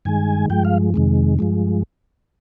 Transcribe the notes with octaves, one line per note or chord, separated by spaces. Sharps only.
G2 D#3 G#3 G#5
G2 F3 G#3 G5
F5
F2 C3 D#3 G#3
G2 F3 G#3